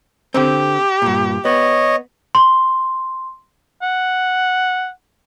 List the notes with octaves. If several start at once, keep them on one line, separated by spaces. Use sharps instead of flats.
D3 C4 G4
G2 A#2
B3 C#5 D#5
C6
F#5